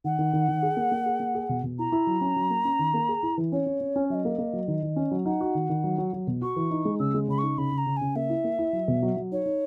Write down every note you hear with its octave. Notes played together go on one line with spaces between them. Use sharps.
D#3 F#5
D#3
D#3
D#3
G#4
A#3
A#3
G#4
A#3
G#4
B2
B2
E4 A#5
E4
F#3
C#4
F#3
A#3
C#4
D#3
A#3
G#4
E4
E3
C#4 C#5
C#4
C#4
C#4
F#3 D#5 E5
A#3
A#3
F#3
D#3
D#3
C#4
F#3
D#4 F#5
F#4
D#3
D#3
F#3
F#3
F#3
B2
F#4 C#6
E3
D#4
G#3
C#3 E6
G#3
C#3 B5
C#6
D#4
C#3 B5
C#3
A#5
C#3
G#5
C#3
A#3 E5
E4
A#3
E4
F#3
B2
F#3
F#3
D#4 C#5
D#4